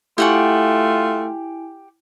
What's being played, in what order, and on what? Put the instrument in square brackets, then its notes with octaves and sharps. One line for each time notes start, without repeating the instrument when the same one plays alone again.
[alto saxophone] A3 [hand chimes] E4 G#5 [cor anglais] F4 [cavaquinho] G4 F#5 C#6